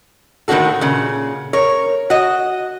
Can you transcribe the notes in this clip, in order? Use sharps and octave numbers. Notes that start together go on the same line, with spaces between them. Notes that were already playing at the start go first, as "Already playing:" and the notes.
A2 D#3 A#3 D4 F#4 A4
A#2 C#3
A#4 C#5
F#4 D#5